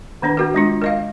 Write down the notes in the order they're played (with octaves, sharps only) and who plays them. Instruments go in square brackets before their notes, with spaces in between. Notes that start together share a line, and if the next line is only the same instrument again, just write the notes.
[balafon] D#3 B3 D4 B4
B3 F#4 A#4
G#3 D4 F4
A#4 D#5 F5